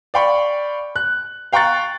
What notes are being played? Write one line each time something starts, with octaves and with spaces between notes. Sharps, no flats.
D5 F5 G5 B5 C#6
F#6
F5 G5 A#5 C#6 F#6 A6